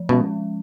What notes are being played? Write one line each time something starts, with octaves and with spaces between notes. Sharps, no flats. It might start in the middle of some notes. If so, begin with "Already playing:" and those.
Already playing: F3
B2 G#3 C#4